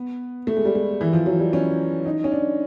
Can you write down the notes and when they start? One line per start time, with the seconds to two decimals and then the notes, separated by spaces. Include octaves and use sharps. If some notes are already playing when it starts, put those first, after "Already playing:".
Already playing: B3
0.47 A3
0.57 G#3
0.65 G3
0.75 G#3
1.01 E3
1.13 F3
1.26 F#3
1.39 G3
1.53 C#4
2.06 D#4
2.24 C#4
2.32 D4